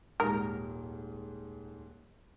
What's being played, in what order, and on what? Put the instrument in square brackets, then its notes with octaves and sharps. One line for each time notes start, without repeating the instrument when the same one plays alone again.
[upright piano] D#1 G#2 [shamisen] A#4